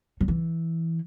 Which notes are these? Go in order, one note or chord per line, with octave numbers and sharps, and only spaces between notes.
F#3
E3